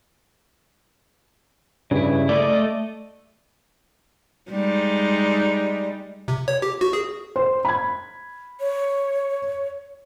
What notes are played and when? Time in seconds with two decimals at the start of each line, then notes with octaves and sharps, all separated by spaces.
1.91 G2 C#3 E4
2.29 A3 A4 D5 D#5
4.51 G3 G#3 D#4
6.28 C3
6.48 C#5
6.62 G4
6.81 F#4
6.93 G#4
7.36 C5
7.65 B5 G#6
8.60 C#5